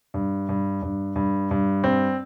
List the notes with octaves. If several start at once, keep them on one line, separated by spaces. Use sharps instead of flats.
G2
G2
G2
G2
G2
C4